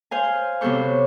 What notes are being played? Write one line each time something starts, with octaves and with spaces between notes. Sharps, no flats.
C5 F5 G#5
C3 F#3 B3 A4 C5 C#6